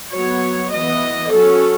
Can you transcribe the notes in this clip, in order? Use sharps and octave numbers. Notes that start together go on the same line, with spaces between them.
F#3 B3 C#5
E3 B3 D#5
F#3 C#4 A4